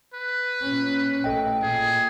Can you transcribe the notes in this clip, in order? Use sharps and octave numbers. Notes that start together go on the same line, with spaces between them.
B4
A#2 C#4
A1 A4 D#5 G5
A#2 G#4